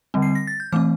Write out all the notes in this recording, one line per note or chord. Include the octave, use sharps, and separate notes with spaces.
D3 G3 C4
C7
A#6
A6
G6
E3 A3 C4 D6 F6